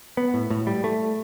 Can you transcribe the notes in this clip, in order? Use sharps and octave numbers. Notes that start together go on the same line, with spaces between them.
B3
A2
A2
G3
A3